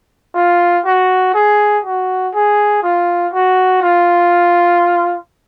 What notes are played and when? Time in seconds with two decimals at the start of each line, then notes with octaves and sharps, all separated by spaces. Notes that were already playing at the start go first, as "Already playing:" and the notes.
0.35 F4
0.85 F#4
1.34 G#4
1.84 F#4
2.34 G#4
2.83 F4
3.33 F#4
3.82 F4